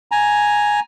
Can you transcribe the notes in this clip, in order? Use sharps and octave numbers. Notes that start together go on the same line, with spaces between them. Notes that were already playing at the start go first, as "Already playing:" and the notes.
G#5 A#5